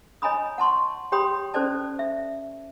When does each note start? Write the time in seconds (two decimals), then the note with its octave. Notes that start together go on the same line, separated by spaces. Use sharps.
0.22 C#5 D#5 G#5 A#5 B5 D#6
0.58 F#5 A5 C6 C#6
1.12 G4 C#5 G5 B5 C6 D#6
1.54 C#4 A4 C5 D5 A5
1.99 E5